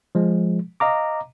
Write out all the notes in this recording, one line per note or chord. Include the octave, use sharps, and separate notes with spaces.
F3 G#3
D#5 F5 A#5 D6